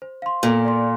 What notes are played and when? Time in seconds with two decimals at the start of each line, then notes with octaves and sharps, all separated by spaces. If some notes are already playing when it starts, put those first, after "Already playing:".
0.02 C5
0.22 F5 C6
0.43 A#2 A4
0.65 D5 F5 C6